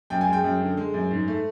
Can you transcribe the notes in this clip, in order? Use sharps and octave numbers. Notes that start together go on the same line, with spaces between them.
F#2 G5
G#5
G#3
G5
F#2
D3
G#3
F#2
G#2
A3